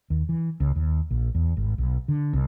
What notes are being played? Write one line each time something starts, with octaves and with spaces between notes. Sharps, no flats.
D#2
E3
C#2
D#2
A#1
E2
G#1
B1
D3
C2